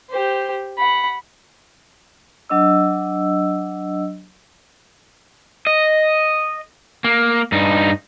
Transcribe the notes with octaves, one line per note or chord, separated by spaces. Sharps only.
G4 C5
F#5 B5
F#3 D4 D#5 E6
D#5
A#3
G2 D#4